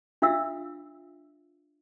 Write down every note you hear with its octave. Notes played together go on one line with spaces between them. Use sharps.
D4 F4 E5 F5 E6